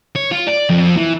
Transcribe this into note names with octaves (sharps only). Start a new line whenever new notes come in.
C#5
F4
D5
F2
E3